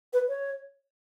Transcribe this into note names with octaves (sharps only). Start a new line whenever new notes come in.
B4
C#5